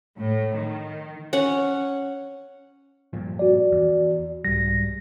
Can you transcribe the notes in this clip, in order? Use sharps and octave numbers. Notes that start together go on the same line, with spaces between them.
A2
D#3
C#4 F#5
G2 A#2 F3
F#4 D5
E2
C2 G#2 G3 A#6